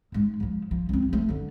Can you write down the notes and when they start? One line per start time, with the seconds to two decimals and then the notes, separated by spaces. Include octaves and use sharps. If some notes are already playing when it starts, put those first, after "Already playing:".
0.12 G#2 G#3
0.40 C#3 F3
0.71 F3
0.89 C#2 C4
1.09 F3 A3
1.29 D3 D4